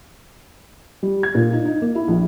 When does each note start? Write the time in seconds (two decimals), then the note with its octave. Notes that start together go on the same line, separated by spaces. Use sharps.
1.03 G3
1.23 G#6
1.35 A#2
1.52 D#4
1.65 D#4
1.82 A#3
1.95 E4
2.08 A#1